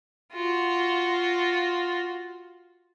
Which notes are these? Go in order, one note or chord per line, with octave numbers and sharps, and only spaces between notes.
F4 F#4